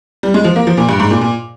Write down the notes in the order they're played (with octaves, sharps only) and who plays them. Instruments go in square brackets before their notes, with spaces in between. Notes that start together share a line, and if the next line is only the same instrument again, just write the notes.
[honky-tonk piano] G3
G#3
F3
A#3
F3
A#2
G2
G#2
A#2
A#2